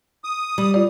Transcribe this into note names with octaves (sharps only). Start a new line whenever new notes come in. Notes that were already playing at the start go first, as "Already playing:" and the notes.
D#6
G3
F4 D5